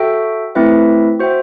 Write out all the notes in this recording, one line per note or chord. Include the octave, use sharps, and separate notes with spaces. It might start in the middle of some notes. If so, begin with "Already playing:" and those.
Already playing: F#4 A4 E5 G5
A3 C4 E4 B4 E5
F#4 C5 E5 G5